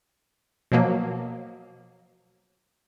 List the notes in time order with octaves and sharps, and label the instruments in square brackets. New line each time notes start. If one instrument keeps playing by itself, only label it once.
[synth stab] B2 F3 F#3 A#3